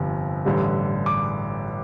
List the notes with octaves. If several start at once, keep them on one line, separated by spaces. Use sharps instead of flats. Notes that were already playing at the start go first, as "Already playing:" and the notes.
Already playing: G1 F2 C3
A1 G2 D3 G3
D6